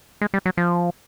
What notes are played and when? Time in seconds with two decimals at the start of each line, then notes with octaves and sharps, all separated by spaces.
0.21 G#3
0.34 G3
0.46 F#3
0.57 F3